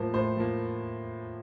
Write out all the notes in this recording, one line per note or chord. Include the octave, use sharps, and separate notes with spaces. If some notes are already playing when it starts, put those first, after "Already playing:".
Already playing: A2 F3 A#3 C5
A2 C5
F3 A#3